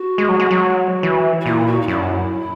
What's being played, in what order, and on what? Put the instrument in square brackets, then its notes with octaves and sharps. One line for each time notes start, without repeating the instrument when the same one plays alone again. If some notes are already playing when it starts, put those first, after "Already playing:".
Already playing: [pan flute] F#4
[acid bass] G#3
F#3
G#3
F#3
E3
[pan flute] F#4
[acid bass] A#2 [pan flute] E4
[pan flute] F#4
D#4
[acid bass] F#2 [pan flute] E4